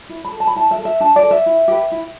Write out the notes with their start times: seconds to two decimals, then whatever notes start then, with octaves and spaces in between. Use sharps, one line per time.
0.09 E4
0.25 B5
0.32 A4
0.40 A5
0.47 B5
0.56 E4 A5
0.71 E5
0.78 A4
0.85 E5
1.00 D4 A5
1.16 D5
1.23 A4
1.31 E5
1.46 E4
1.68 G4 B4
1.92 E4